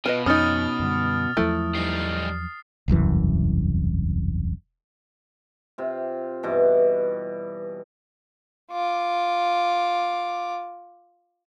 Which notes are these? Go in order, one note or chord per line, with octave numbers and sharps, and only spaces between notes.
B2 F4 B4 D#5
F2 C#4 D#4 D#6 F6 A6
F#2 D3 G3
E2 F3 F#3 A3 E4
G3 D#4 C7
E1 C2 F#2 E3
C3 F4
G2 B2 E3
F4 D6